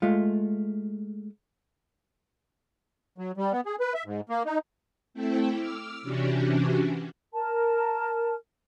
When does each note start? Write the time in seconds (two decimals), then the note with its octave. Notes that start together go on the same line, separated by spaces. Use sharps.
0.02 G#3 A3 F4
3.18 F#3
3.37 G3
3.52 B3
3.66 G#4
3.80 B4
3.94 E5
4.06 G#2
4.29 A#3
4.46 D#4
5.14 A3 C4 E4 A4 G5
5.52 D6 E6 F6
6.02 C3 E3 C#4 D4 F#4 G4
7.34 A#4 A5